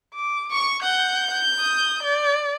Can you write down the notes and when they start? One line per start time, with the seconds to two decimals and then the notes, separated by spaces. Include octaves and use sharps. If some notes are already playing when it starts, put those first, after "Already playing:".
0.14 D6
0.51 C#6
0.82 F#5 G6
1.60 D#6
2.03 D5